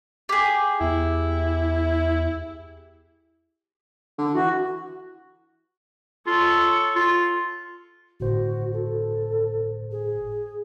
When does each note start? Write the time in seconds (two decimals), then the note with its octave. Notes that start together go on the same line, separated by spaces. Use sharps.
0.29 G4 G#4
0.81 E2 E4
4.18 D3
4.35 E3 F#4
6.27 F4 A4 C#5
6.96 F4
8.20 G1 A2 F#4 C5
8.73 A4
9.91 G#4